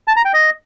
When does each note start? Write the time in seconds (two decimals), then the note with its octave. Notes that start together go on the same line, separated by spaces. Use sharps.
0.08 A5
0.16 A#5
0.25 G5
0.34 D#5